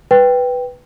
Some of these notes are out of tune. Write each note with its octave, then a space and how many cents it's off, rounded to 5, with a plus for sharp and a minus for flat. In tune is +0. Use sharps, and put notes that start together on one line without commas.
B4 +0 G5 +0